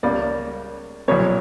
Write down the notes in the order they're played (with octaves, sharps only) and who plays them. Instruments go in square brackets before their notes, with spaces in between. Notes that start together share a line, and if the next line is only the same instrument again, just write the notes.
[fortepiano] C#2 C#3 G3 A#3 [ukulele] D5
[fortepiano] B1 A#2 G3 [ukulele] C#5